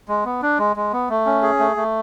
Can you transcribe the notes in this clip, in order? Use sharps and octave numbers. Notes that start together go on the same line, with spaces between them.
G#3
B3
D4
G#3
G#3
B3
A3
C#4
G#4
A3
A3